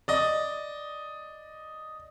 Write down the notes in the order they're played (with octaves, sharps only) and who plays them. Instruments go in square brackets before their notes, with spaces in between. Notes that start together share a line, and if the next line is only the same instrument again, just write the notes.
[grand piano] D5 D#5